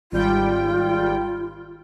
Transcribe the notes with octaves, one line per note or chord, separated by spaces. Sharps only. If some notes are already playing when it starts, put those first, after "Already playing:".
G#1 G3 F4 G5